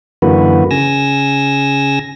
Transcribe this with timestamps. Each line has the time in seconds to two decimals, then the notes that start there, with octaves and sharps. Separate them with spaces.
0.22 F#2 D3 E3 A#3 F#4 B4
0.71 C#3 G#5 E6 A#6